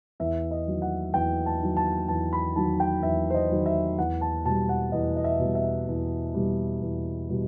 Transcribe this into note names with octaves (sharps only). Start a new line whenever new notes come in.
E2 E5
D#5
D#3 F#3
F#5
E2 G5
A5
D#3 F#3
A5
E2 A5
B5
D#3 F#3 A5
G5
E2 E5
C5
D#5
D#3 F#3
E5
E2 F#5
A5
B2 G3 A5
F#5
E2 D#5
D#5
E5
B2 G3
E5
E2
B2 G3
E2
B2 G3